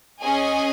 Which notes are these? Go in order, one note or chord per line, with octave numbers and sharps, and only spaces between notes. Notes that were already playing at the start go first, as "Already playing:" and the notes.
C#4 G#4 D#5 G#5